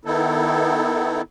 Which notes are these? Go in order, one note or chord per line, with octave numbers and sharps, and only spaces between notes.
D#3 B3 D#4 E4 A4